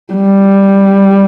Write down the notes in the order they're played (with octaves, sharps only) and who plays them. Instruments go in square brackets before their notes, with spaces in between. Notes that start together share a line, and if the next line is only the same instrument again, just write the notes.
[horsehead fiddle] G3